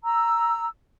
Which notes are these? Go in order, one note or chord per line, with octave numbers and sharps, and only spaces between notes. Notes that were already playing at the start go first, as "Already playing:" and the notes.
A#5 E6